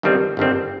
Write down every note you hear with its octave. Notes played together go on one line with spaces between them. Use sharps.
G1 G2 D#3 G3 C4
G1 G2 D#3 G3 C4